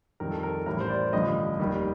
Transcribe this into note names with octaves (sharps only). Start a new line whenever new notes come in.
F2 D#3 G3 A#4
A4
A#4
A4
A1 A2 G3 A#4
C5
D5
A1 G2 D3 F3 D#5
F1 D#2 D#3 G3